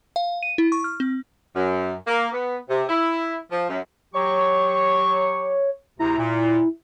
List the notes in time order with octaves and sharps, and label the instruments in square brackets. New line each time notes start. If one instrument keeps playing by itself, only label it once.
[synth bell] F5
D#7
E4
C#6
F6
C4
[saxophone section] F#2
A#3
B3
C3
E4
F3
F#2
[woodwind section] F#3 G4 C#6 [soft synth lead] C#5
[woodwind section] D2 C3 A#5 [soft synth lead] E4
[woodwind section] A#2